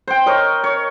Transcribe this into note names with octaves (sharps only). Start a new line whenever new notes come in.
C5 G5
A#4 C#5 D#5
C#5